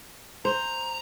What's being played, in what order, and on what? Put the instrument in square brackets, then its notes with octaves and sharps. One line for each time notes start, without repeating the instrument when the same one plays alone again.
[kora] C5 [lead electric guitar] A#5